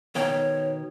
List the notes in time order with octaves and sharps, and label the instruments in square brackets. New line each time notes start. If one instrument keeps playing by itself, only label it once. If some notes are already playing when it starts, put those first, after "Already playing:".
[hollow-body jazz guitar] B2 D#3 G5 [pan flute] C#5